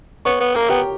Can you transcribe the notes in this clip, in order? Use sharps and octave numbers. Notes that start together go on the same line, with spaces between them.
B3 C#5 C#6
B3
A#3 A#4 A#5
B3 G4 G5